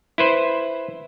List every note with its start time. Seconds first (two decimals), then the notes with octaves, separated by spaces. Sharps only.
0.18 E4 B4 C5